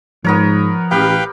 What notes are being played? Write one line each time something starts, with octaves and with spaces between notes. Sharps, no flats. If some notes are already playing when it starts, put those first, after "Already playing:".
G#2 F3 B3 A#4 C#5
A1 G4 B4 F5 G5